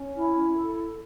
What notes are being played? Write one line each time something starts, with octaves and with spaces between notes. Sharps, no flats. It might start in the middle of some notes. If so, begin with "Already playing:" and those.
Already playing: C#4
E4
A4